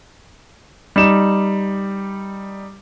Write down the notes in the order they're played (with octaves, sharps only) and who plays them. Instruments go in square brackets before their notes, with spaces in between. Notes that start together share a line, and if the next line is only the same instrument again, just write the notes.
[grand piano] G3 D#4 E7